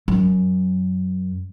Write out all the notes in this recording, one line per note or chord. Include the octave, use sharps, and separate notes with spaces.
F#2